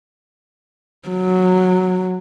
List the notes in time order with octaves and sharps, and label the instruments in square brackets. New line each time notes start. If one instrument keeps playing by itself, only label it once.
[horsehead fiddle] F#3